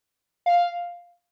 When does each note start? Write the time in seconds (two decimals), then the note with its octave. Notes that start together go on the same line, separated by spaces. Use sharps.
0.46 F5